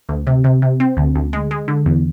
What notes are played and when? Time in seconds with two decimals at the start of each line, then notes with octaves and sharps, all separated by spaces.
0.09 D2
0.27 C3
0.44 C3
0.62 C3
0.80 C4
0.97 D2
1.15 D2
1.33 G#3
1.51 G#3
1.68 D3
1.86 E2